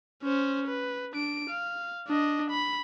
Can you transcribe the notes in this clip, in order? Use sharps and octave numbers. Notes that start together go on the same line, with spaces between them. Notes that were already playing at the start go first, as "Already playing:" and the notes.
C#4 C5
B4
D4 D7
F5
D4 D#5
B5